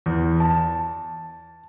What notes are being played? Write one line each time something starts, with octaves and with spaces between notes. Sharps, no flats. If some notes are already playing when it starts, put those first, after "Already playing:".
E2
A5